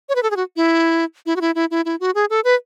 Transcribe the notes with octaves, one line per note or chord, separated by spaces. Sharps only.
C#5
B4
A4
G#4
F#4
E4
E4
F#4
E4
E4
E4
E4
F#4
G#4
A4
B4